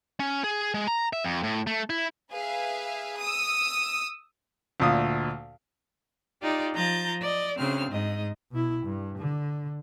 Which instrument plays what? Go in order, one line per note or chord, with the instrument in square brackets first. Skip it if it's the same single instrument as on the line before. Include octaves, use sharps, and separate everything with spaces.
[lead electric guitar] C#4
G#4
G#3
A#5
E5
F2
A2
A3
E4
[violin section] G#4 B4 E5 F5
D#6 E6
[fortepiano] D2 A#2 D#6
[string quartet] D#4 F4 G4 D5
F3 A#5 G6 A6
D5 D#5
D2 C#3 C4 F6
G#2 D#5
[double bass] B2 E4
G2
D3